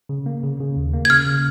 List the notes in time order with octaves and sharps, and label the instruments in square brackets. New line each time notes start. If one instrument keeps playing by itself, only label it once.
[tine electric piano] C#3
A#3
C#3
C#3
D#2
A#3
[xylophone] G#6
[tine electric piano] C#3 [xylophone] F6
[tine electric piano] C#3